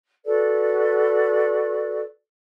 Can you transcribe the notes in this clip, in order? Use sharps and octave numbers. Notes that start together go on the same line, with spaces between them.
F#4 A4 B4 D5